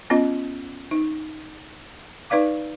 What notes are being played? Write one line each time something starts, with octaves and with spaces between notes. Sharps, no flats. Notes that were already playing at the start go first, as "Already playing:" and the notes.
B3 C#4 F4 D#5
D#4
D#4 B4 D5 F5 D6